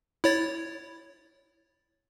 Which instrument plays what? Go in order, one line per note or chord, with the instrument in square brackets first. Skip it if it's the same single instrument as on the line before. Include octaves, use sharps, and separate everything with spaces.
[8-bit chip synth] E4 C#5 A6